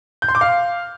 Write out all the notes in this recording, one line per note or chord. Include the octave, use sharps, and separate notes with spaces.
G6
C6
D6
F5